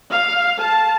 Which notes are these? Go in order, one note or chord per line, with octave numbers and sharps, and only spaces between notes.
F5
A5